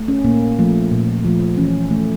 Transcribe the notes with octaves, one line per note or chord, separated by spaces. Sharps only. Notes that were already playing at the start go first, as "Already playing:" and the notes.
Already playing: A3
C#4
A#2 A#3
F3 A3
A#2
F3 A3
E3 C#4
A3